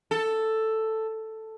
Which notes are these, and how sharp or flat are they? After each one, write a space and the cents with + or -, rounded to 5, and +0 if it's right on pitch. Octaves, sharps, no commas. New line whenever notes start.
A4 +5